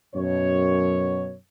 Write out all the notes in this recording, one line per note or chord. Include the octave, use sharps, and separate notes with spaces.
F#2 B2 C#5